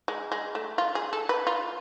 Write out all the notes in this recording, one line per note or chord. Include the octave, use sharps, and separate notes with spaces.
G#3
G#3
A3
F4
G#4
A4
B4
F4